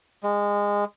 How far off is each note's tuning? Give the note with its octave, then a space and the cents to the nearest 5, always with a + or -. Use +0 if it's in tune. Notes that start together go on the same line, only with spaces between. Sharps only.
G#3 -20